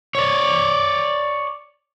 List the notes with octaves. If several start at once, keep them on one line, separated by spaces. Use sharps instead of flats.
C#5 D5